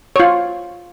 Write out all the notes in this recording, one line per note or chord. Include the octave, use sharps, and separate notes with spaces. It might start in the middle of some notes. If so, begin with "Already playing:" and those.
F4 C#5